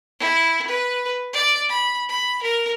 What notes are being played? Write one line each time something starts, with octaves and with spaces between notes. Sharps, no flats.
E4
B4
D5
B5
B5
A#4